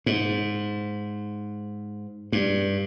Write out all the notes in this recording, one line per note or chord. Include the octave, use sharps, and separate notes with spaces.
G#2
G2